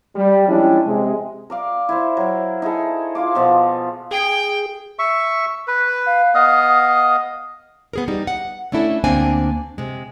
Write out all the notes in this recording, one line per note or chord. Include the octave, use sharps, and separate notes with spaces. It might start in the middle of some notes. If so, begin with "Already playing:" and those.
G3
F3 G3 G#3 C#4 D4 E4
C3 G#3
A#4 D5 F5
E4 A#4 C5
F#3 A#4
D#4 E4 G#4 A4
F4 C5 F5 D6
B2 F3
G#4 G5
E5 C#6
B4
F5
B3 D#5 F5 D#6
B3 G#4 A#4
G3 D#4
F#5
A3 C#4 D4 E4 A4
D2 A#3 C4 D4 G#5
C3 G#3